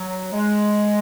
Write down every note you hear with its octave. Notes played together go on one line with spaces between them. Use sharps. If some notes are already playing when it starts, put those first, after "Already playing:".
Already playing: F#3
G#3